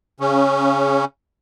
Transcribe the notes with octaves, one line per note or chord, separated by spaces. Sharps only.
C#3 C#4